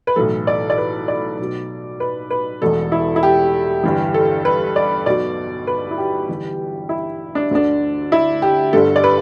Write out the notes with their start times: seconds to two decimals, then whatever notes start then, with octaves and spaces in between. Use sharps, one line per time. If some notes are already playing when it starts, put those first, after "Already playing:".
0.07 B4
0.16 B1 A2 E3 A4
0.47 D5
0.70 D5
0.78 B4
1.08 D5
1.38 B1 B2
2.00 B4
2.31 B4
2.62 E1 E2 E3 A4
2.92 E4
3.16 E4
3.23 G4
3.83 G1 G2 E3
4.14 A4
4.45 B4
4.76 D5
5.06 B1 B2 D5
5.67 B4
5.91 E4
5.98 G4
6.28 G1 G2 E3
6.89 E4
7.35 D4
7.51 D2 D3 D4
8.12 E4
8.42 G4
8.73 G1 G2 D3 A4
8.96 D5
9.04 B4